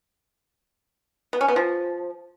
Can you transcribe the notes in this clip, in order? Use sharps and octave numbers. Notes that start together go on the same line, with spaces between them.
B3
C#4
B3
F3